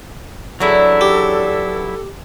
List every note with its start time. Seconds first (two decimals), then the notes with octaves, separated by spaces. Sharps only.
0.60 C#3 E3 F#3 D4 E4 A4
1.01 G4